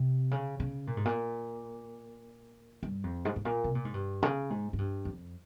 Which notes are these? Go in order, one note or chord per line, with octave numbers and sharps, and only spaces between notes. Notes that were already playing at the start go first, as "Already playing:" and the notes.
Already playing: C3
C#3
C#3
A#2
G#2
A#2
G2
F2
G#2
G#2
A#2
C3
A#2
G#2
G2
C#3
G#2
G#2
G2
F2